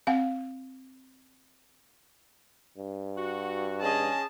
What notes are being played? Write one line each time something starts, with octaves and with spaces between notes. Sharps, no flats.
C4 F5 F#5
G2
F#4
C#4 G#4 D#5 A5